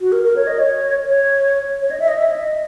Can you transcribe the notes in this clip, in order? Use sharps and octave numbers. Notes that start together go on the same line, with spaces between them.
F#4
A#4
A#4
C#5
D#5
C#5
C#5
C#5
D#5
E5
D#5
E5
D#5